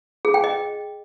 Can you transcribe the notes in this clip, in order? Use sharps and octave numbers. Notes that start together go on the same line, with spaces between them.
G#4
G5
D#5